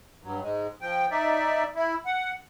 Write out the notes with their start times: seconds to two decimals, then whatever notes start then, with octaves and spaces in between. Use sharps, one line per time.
0.23 G2 F#3
0.42 G#2 G#3
0.81 F3 G5
1.11 D#4 D5 E5
1.76 E4
2.06 F#5